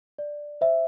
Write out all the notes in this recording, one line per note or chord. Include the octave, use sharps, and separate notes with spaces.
D5
C5 E5